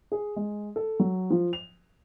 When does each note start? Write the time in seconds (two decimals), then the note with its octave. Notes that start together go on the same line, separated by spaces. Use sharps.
0.12 G#4
0.36 G#3
0.76 A4
0.99 F#3
1.30 F3
1.53 F7